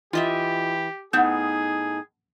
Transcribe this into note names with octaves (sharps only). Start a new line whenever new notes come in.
E3 F4 G4 D#5 E5
A2 B3 D#4 G#4 F#5 G6